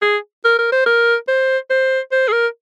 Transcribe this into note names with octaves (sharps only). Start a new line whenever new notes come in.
G#4
A#4
A#4
C5
A#4
C5
C5
C5
G#4
A#4